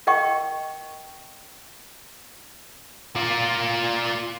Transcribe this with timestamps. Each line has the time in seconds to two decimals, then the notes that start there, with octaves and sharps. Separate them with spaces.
0.07 A#4 D#5 G5 C#6
3.16 F4 D5